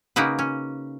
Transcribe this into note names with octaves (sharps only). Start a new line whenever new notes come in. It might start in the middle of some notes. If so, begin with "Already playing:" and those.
C#3 A#3 D#4 F#4 B4
C#4